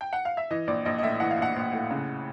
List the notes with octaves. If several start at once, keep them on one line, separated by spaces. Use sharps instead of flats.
G5
F#5
F5
E5
E3 D#5
A#1 D5
A#1 D#5
D#5
A2 E5
E3 F#5
F5
A#1 F#5
A#1
A2
C#3